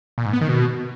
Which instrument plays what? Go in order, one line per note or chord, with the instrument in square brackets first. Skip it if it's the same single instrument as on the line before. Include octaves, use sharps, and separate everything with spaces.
[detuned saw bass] A#2
G#2
B3
D#3
B2